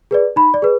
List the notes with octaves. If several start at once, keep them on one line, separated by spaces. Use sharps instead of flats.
G#4 B4 D5
D#4 B5
D5
G#4 B4